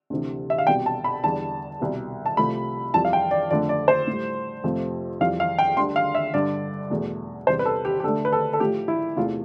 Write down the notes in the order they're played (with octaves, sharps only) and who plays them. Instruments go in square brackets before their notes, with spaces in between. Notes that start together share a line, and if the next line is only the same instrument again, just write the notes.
[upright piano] D2 C3 E3
E5
F5
C2 B2 G3 G5
A5
B5
E2 D3 G3 A5
C2 B2 G3
A5
C2 C3 F3 A3 B5
F2 E3 G3 A5
F5
G5
D5
F2 D3 A3 D5
D5
C5
A2 G3
F2 C3 F3 A3
F2 E3 G3 F5
F5
G5
D2 D3 G3 C6
F5
E5
G2 D3 G3 D5
E2 B2 A3
E2 C3 G3 C5
B4
A4
G4
G4
D2 D3 A3 A4
B4
A4
A4
A2 F3 A3 G4
E4
E2 C3 E3 A3 F4